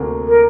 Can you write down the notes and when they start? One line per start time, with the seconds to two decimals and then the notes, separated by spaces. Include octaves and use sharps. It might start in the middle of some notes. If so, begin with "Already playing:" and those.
Already playing: D2 C3 A#3
0.26 A#4